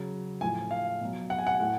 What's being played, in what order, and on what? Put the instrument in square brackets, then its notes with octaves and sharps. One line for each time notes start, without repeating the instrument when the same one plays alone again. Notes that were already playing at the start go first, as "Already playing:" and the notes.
Already playing: [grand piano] C#3 F#3
A2 G#5
F3
F5
B2 F#3
F#5
G#5
F#5
A2